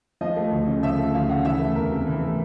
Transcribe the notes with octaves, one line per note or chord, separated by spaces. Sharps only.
F3 D#5
A3
D2
C#3
F3 E5
A3
D2 F5
C#3 F#5
E3 E5
A3
E2 A#4
C3
E3
A3